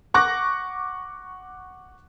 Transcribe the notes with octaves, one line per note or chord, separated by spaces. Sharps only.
F#5 C#6 D6 F#6 A#6